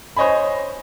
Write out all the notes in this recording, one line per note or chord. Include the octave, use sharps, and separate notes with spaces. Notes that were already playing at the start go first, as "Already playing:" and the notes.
C5 C#5 D#5 G#5 B5